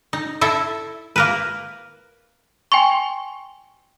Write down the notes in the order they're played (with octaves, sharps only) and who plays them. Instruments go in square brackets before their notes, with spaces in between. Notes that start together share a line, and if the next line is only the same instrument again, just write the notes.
[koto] D#4
E4 A4 E5
A#3 A#4 B4
[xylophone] G5 G#5 C6 C#6